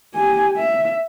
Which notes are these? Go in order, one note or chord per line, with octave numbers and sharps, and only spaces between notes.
G4 G#5
E5